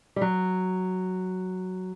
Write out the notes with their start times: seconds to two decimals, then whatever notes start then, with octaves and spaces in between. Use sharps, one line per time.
0.16 G3
0.21 F#3